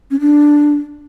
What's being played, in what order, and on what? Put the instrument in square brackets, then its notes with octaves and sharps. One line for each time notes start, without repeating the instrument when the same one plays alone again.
[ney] C#4
D4